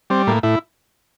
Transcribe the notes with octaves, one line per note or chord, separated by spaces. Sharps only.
G3 C4
A2 A#3
A2 E4